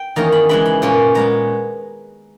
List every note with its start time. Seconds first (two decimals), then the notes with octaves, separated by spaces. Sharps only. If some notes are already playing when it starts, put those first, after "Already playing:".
Already playing: G5
0.16 E2 D#3 A#3 C#4 A#5
0.32 B5
0.49 C#3 E3 G#3 B5
0.66 B5
0.82 A#2 A#3 C#4
1.15 A#2 G#3 B3 A#5